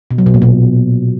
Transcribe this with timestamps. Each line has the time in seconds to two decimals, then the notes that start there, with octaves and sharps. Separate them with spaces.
0.11 B2
0.18 F#3
0.26 B2
0.34 A#2
0.42 B2